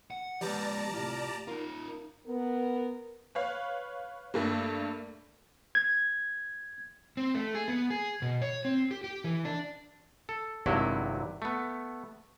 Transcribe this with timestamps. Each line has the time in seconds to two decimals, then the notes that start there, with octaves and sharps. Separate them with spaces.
0.11 F#5
0.41 F3 G#3 G4 B4 D5 A5 A#5
0.94 C2 A2 F4 G4
1.48 D#4 F4 A#4
2.27 B3 A#4
3.35 B4 C#5 F5
4.34 G2 A3 A#3
5.75 G#6
7.17 C4
7.35 A3
7.55 G#4
7.68 B3
7.90 G#4
8.22 B2
8.42 C#5
8.65 C4
8.91 G4
9.04 G4
9.24 E3
9.45 D4
10.29 A4
10.66 G#1 G2 C3 F#3 E4
11.42 A3 B3